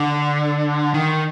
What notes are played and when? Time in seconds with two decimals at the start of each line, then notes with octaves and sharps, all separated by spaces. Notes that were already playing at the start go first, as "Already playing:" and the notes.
Already playing: D3
0.94 D#3